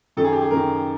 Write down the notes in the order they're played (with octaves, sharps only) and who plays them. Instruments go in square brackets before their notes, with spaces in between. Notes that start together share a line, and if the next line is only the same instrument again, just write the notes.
[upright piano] F#2 D#3 A4
G#4
G4
G#4
F#2 D#3 A#4